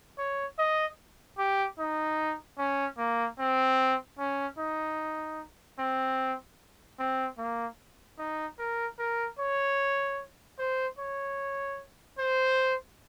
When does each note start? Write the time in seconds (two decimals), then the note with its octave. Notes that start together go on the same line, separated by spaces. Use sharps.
0.18 C#5
0.58 D#5
1.38 G4
1.79 D#4
2.58 C#4
2.98 A#3
3.39 C4
4.19 C#4
4.58 D#4
5.79 C4
6.99 C4
7.38 A#3
8.18 D#4
8.58 A#4
8.99 A#4
9.39 C#5
10.58 C5
10.98 C#5
12.18 C5